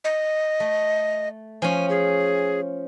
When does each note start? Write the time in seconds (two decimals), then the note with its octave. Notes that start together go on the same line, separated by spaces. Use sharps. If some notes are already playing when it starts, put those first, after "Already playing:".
0.04 D#5
0.60 A3
1.62 F3 C#4 G#5
1.89 G#4